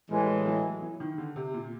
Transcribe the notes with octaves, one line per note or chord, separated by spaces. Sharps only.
A2 E3 G3 G#3
F#3
E3
D#3
D3
C3
A#2